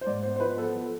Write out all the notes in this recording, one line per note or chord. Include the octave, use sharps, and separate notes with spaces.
C5
G#2 D5
B3 C5
C5
F3 B4
B3 A4
F3